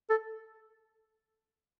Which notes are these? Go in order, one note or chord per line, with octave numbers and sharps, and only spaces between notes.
A4